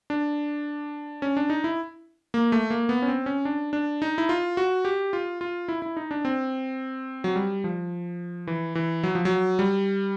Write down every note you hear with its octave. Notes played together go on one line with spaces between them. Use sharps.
D4
C#4
D4
D#4
E4
A#3
A3
A#3
B3
C#4
C4
C#4
D4
D4
D#4
E4
F4
F#4
G4
F4
F4
E4
E4
D#4
D4
C4
F#3
G3
F3
E3
E3
F#3
F3
F#3
G3